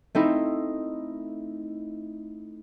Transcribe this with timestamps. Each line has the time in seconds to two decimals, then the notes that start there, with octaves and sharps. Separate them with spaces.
0.15 A3 C4 D#4 E4